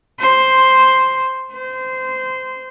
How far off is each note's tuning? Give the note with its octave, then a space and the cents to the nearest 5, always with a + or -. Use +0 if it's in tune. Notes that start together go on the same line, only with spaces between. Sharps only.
C5 +0
C5 -20